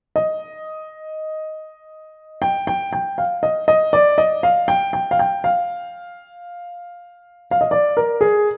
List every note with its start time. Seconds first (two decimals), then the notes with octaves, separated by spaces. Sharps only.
0.16 D#5
2.42 G5
2.67 G5
2.93 G5
3.18 F5
3.43 D#5
3.68 D#5
3.93 D5
4.18 D#5
4.43 F5
4.68 G5
4.93 G5
5.11 F5
5.19 G5
5.44 F5
7.51 F5
7.61 D#5
7.71 D5
7.97 A#4
8.21 G#4